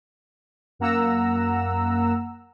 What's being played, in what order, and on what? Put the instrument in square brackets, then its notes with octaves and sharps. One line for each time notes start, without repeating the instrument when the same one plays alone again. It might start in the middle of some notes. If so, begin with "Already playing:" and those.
[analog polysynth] F#2 A#3 F#5 A#5 E6